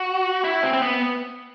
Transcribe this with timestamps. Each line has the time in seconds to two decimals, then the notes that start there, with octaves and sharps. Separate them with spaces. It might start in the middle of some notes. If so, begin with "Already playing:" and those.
Already playing: F#4
0.44 E4
0.63 C4
0.73 C4
0.82 B3